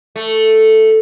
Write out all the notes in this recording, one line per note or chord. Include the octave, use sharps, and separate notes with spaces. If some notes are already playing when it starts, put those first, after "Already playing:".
A3